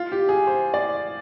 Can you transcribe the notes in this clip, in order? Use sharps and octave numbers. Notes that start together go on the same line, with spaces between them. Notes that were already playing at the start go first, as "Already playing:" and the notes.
Already playing: F4
G4
G#4
C5
D5